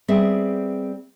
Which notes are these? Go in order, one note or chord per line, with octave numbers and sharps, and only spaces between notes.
G3 B3 C4 G#4 E5